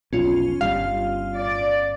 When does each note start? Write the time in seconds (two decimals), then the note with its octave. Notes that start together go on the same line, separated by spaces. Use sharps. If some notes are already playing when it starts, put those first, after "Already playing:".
0.13 F1 B1 C#4 F4
0.61 G1 C2 G3 F5
1.37 D5